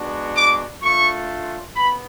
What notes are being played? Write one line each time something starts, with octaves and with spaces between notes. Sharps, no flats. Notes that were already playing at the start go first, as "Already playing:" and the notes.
Already playing: G#3 B3 D4 F#4
D6
A3 D4 F4 C#6
B3 B5